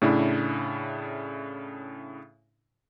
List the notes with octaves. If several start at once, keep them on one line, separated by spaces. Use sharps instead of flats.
A2 C#3 D4 E4